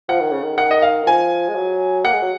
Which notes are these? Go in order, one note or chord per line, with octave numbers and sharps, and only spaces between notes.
F3 F#5
D#3
C#3
D#3
D#3 F#5
D#5
F5
D#3
F3 G#5
G#3
F#3
A#3 F#5
G#3
F#3